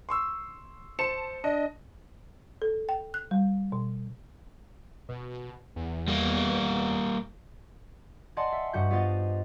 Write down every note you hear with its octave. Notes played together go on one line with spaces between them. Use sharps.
C6 C#6 E6
C5 A5 C#7 E7
D4 D#5
A4
G5
F#6
G3
B2
B2
E2
G3 A#3
D5 D#5 F#5 G#5 A5 C6
E5
G2 G3 F#4 F#5 G6
B3 F4 G4 C5 D#5 A6